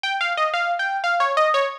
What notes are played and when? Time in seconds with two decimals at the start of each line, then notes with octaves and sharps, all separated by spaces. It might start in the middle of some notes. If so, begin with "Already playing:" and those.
0.03 G5
0.21 F5
0.37 D#5
0.54 F5
0.79 G5
1.04 F5
1.20 C#5
1.37 D#5
1.54 C#5